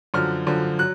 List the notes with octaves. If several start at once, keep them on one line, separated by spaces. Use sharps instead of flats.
F#2 D3 F3 F6
F#2 D3 F3
F#3 F#6